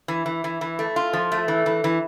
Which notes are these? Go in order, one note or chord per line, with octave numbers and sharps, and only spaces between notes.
E3
E3
E3
E3
A3
F4
F3
A3
E3
E3
E3